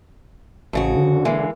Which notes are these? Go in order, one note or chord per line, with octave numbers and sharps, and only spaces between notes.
A1 F2 C#3 F#4
D3
E3 G#3 A#3